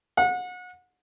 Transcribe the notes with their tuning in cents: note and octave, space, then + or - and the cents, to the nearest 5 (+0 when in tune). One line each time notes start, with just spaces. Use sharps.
F#5 -30